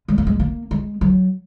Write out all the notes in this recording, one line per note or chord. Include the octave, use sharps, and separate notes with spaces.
G#3
A#3
G#3
A#3
G#3
F#3